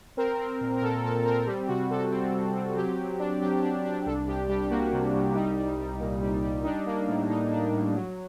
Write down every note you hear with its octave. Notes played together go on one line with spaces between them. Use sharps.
C4 A#4
C4
A#2
A#4
A#2 A4
A#2 A4
A4
C4 A#4
G3 G4
C3 F#4
C3 A4
C4
C3
C4
F#3 G4
F#3
D4
F#3 G4
D4
D4
C2 A4
C2 G4
G3 G4
A#3 F#4
C3
C2
G3 D#4
G3
G3
A#2
G3
G3
D4 D#4
A#3
A2
A2 D#4
D4
A2
F#3